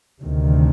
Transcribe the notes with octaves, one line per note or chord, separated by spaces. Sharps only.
D2 C3 D#3